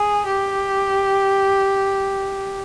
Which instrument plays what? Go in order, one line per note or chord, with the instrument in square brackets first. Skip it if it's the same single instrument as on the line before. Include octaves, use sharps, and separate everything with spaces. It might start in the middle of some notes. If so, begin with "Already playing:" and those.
Already playing: [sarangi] G#4
G4